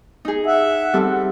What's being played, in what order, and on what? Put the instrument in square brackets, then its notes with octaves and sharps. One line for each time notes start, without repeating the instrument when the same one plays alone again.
[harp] D#4 G#4
[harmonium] E5 [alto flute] F#5
[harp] G3 C4 A4